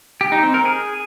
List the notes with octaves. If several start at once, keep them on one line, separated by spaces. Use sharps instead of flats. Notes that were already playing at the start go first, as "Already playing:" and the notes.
G4
D#4
C4
A#4
G#4